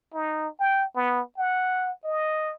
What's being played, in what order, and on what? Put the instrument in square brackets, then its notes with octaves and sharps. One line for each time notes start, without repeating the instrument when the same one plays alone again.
[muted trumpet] D#4
G5
B3
F#5
D#5